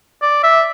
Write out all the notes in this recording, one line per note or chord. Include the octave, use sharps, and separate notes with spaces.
D5
E5